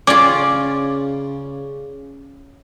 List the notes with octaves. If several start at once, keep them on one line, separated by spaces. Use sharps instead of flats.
C#3 C#4 F4 D5 D6